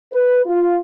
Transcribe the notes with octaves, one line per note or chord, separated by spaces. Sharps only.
B4
F4